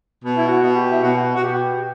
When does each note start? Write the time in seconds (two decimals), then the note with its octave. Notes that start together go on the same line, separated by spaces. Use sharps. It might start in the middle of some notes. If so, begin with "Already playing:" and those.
0.22 B2
0.37 E4
0.48 F#4
0.62 B2
0.76 G4
0.91 E4
1.02 B2 F#4
1.35 F#4
1.43 B2 G4